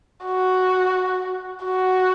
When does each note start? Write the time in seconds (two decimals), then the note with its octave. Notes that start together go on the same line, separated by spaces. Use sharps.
0.25 F#4
1.65 F#4